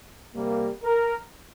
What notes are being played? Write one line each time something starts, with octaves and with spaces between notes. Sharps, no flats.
C3 G3 A#3
A#4